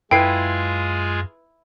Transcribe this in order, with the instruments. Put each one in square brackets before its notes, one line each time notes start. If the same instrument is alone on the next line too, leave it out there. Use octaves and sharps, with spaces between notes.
[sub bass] F#2 [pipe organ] G#3 F4 G#4 [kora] E4 B4 [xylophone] G5 C7